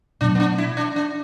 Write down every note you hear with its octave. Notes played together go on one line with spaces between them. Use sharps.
B2 F#3 A3 D4
B3
D4
E4
D4
D4